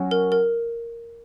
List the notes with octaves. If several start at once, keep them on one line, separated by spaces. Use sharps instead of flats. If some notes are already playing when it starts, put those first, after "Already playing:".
Already playing: F#3 C#4 F#4 C#5
A#4
A#4